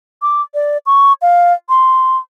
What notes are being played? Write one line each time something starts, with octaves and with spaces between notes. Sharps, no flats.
D6
D5
C#6
F5
C6